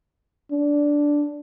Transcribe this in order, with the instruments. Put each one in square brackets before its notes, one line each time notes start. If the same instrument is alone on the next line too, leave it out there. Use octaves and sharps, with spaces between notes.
[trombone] D4